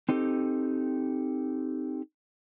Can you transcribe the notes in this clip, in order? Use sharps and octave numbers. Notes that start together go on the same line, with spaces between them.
C4 D#4 G4 A4